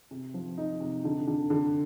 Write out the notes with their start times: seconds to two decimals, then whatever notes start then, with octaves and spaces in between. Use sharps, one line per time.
0.11 C3
0.34 F3
0.58 D#4
0.80 C3
1.04 D3
1.27 D3
1.50 D3